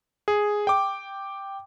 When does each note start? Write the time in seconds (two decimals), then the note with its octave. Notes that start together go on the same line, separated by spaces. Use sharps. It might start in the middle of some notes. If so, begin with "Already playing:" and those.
0.28 G#4
0.67 G5 D6